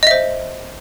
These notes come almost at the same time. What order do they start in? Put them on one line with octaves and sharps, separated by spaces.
D#5 E5 C5